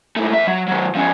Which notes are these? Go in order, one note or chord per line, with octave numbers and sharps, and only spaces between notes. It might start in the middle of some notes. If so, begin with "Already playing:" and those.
G#2 A3
E2 E5
F#3
D#3 F#3
F3 C#4